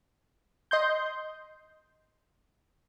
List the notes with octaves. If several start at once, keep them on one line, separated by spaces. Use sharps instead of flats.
D#5 C6 G6